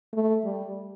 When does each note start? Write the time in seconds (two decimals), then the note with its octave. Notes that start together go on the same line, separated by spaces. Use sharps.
0.13 A3
0.44 G3